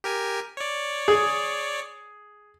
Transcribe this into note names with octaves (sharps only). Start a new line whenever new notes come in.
G4 A#4 G#5
C#5 D5
G#4